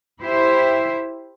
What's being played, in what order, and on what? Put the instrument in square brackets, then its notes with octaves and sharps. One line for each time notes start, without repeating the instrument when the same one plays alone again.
[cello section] E4 G4 C5 E5